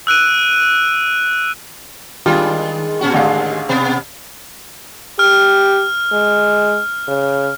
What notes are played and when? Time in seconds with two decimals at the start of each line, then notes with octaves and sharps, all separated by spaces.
0.07 E6 F#6 D7 D#7
2.26 D#3 G3 G#3 D4 F4
3.01 A#2 C#4 F#4
3.13 A1 D#2 D3 G#3 F5
3.69 B2 B3
5.19 G4 F6
6.12 G#3
7.08 C#3